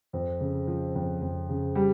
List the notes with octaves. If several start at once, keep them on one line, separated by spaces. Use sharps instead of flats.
F2
C#3
F3
F2
F2
C#3
G3